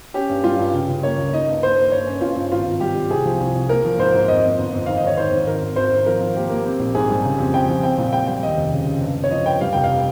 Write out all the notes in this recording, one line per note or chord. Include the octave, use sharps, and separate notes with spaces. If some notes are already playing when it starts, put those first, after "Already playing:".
C#4 G4
G2
G3 F4
G2
C#3
C#3
A#3 C#5
C#2
D#4 D#5
G2
A#3 C5
A#3
G2 C#5
C#4
G2 F4
G2
G#1 F4
G#1
G3 G4
G3
C2 G#4
F3
C2
C2
A#3 A#4
F3
G#2 C5
G#2
F2 D#5
F2
G1
F2
D#3 F5
D#5
G#2 C#5
D#3 C5
G#2
G#1 A#4
G#1
G#1 C5
G#1
F3 A#4
F3
A#3 G4
A#3
C4
A#1
G#2 G#4
G3
C#3
F2
F2 G5
F3
C4 G5
A#2
G3 G5
G3 G5
D#2 D#5
F1
C#3
C#3
G2
G2
C#5
F3 D#5
G2 G5
G3 F5
F1 G5
F5